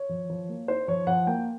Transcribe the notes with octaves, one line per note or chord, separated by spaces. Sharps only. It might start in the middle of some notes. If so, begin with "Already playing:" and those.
Already playing: C#5
F3
F3
A#3
D#4 C5
F3 C#5
F3 F#5
A#3 G5